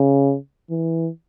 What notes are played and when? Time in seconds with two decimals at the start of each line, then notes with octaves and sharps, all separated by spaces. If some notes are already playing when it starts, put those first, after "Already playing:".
Already playing: C#3
0.70 E3